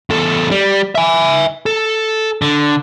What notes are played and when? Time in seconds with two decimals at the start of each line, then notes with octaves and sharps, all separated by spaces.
0.10 E2 A4
0.51 G3
0.95 E5 G#5
1.66 A4
2.42 D3